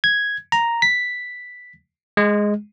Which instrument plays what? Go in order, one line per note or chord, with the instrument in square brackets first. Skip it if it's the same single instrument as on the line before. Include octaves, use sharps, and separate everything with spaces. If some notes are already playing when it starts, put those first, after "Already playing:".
[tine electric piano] G#6
A#5
B6
G#3